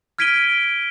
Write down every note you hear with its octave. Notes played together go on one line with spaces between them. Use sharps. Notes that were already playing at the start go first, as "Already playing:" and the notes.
F6 G#6 B6 D7 D#7 G7